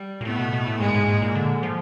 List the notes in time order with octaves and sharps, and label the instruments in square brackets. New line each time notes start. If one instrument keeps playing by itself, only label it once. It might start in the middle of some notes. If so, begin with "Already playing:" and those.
Already playing: [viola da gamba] G3
[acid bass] A#2
[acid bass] A2 [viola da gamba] A3 B3
[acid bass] B2
B2
A2
[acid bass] G#2 [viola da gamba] G#3 A#3
[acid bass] G#2
G#2
A#2
D3
F3